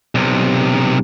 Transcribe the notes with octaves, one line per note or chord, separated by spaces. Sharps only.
B1 C3